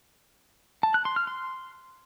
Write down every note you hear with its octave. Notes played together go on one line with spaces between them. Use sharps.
A5
F#6
C6
F6
C6